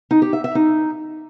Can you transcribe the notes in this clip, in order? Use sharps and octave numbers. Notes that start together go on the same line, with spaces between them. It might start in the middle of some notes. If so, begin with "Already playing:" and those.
D#4
G4
E5
E5
D#4